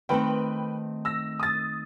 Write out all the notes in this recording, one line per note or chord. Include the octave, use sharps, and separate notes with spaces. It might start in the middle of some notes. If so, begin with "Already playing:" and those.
D#3 A3 C4 B4 G5
E6 A#6
D#6 A6